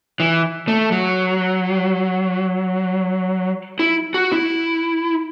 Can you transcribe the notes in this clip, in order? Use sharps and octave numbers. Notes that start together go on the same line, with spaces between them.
E3
A3
F#3
E4
F#4
E4